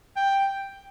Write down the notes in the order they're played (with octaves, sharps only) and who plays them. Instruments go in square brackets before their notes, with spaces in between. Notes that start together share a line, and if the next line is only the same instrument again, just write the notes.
[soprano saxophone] G5